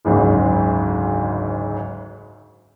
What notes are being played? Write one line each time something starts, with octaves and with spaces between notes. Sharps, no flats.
F#1 D2 G#2 C#3